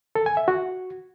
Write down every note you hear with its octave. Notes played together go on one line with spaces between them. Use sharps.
A4
G#5
E5
F#4